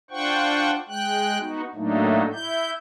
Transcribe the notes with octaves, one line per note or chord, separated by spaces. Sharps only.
D4 F4 C5 F#5 G5 C#6
G#3 G5 F#6
B3 D#4 F#4
A2 F#3 A3 A#3 D4 D#4
E4 G6